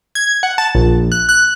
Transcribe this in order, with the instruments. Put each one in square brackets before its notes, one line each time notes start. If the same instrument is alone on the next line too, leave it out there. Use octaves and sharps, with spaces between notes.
[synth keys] G#6
F#5
A5
A#1
F#6
F#6